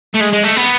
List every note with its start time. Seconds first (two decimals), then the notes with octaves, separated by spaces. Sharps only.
0.15 A3
0.21 G#3
0.33 G#3
0.44 A3
0.57 B3